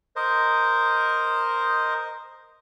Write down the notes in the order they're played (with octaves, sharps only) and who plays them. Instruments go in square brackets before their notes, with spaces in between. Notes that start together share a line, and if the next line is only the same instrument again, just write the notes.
[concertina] A#4 C5 D#5